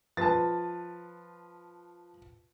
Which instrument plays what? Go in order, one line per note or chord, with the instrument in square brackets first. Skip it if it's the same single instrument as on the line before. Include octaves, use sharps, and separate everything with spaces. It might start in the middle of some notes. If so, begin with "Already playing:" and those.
[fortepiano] F3 B4 [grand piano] A5 A6